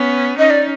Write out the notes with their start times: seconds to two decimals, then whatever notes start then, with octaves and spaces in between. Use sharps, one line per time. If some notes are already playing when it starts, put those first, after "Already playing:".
Already playing: B3 C#4
0.38 C#4 D#4 D#5
0.50 D5